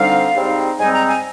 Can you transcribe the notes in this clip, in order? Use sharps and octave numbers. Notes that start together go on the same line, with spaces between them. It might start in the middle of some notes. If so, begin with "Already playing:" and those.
Already playing: D3 G3 C4 D#4 F5
G#2 G3 C4 D#4
G#2 G3 C4 D#4 G#5
A#5
G#5